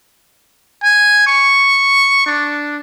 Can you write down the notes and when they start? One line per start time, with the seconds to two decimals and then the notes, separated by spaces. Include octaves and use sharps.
0.84 G#5
1.27 C#6
2.26 D4